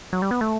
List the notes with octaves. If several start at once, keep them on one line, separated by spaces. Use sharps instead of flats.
F#3
G3
B3
A3